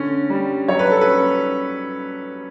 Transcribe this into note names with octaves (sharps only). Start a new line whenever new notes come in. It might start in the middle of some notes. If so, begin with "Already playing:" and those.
Already playing: D3 C#4
G3
F#3 C#5
B4
A4
B4
C#4